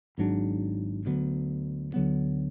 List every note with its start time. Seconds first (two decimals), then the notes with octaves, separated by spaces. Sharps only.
0.18 G#1 G#2 F#3 D4
1.06 D2 D3 F#3 B3
1.94 D2 D3 F#3 B3